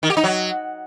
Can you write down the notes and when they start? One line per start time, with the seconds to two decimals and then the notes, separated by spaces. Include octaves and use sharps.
0.03 D#3
0.10 G4
0.17 D#4
0.24 F#3